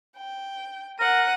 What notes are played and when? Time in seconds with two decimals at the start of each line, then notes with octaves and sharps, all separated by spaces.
0.17 G5
0.99 A#4 F#5 D#7